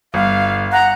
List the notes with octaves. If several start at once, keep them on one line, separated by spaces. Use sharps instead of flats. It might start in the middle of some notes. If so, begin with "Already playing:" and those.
G1 F5
F#5 A#5